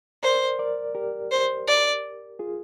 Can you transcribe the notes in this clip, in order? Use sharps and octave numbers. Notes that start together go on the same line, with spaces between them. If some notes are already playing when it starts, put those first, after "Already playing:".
A#4 C5 D5
A#4 D5
G4 A#4
C5
D5
F4 G#4